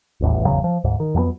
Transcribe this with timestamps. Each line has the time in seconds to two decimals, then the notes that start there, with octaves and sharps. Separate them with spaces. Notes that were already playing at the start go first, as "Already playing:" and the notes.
0.20 D#1 A1 E2
0.45 G#1 E2 C#3 F#3
0.64 F3
0.84 D2 G#2
1.00 D#3
1.15 F2 F#3 A3 B3